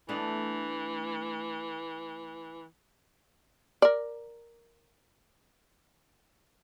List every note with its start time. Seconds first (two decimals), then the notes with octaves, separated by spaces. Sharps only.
0.09 E3 A3 B3 D4
3.82 A#4 D5